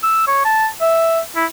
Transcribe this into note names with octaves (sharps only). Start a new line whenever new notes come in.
E6
C#5
A5
E5
E4